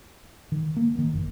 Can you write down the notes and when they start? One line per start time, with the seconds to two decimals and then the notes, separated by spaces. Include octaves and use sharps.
0.52 D#3
0.77 A#3
0.99 D#3
1.13 F#1